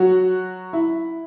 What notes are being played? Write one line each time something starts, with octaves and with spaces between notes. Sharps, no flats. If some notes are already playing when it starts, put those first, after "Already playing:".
Already playing: F#3 F#4
E4